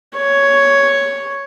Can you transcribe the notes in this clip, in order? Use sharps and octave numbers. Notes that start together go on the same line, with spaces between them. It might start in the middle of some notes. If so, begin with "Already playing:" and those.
C#5